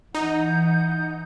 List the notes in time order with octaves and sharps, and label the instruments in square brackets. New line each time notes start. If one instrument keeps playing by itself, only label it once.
[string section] E3 [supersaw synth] D#4 [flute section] F#5 D#6 G6